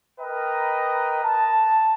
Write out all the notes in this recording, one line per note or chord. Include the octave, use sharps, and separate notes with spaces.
A#4 B4 D#5 G5 A#5 B5
A5